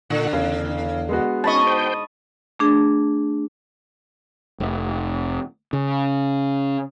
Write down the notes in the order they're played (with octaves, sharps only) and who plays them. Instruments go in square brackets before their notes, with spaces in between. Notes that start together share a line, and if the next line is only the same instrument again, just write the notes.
[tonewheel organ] A#2 F#5 [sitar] D3
[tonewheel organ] E2 [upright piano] C#3
[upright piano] G#3 B3 F#4
[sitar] G#2 D#5 [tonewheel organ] C#4 [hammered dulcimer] A5 B5 C#6
[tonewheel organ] C5 G5
[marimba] A3 D4 G#4
[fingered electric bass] F1
C#3